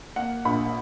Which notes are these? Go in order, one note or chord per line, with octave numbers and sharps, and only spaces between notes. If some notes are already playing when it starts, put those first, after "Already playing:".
A#3 F#5
A#1 B5